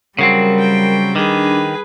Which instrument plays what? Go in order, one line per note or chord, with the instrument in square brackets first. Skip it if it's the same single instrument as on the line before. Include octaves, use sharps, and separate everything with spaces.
[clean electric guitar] C#3 F#3 C4 [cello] G3 [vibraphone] A#4
[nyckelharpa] G5
[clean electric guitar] D#3 [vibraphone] D4 [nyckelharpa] G#4 B4